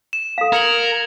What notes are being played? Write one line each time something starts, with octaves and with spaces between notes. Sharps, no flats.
E7
A4 F5
A#4 G#6 C#7 F#7